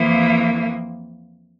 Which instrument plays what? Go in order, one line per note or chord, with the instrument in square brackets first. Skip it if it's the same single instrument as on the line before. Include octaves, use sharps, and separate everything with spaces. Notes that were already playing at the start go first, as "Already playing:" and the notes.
Already playing: [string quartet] F2 E3 A#3